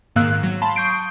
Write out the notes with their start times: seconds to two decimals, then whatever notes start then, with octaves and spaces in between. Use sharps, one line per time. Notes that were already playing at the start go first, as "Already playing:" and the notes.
0.16 G#2 D#3 A#3 F5 E6 F#6
0.43 F#3
0.62 F5 A5 B5 C6
0.76 C#6 D#6 G6 C7 D7